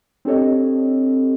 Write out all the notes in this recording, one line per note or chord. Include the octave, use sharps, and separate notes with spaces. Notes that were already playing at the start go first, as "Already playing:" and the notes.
C4 D4 G4 A4 C#5 D#5